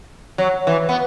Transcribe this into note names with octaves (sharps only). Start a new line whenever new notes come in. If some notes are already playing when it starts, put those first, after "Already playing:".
F#3
E3
B3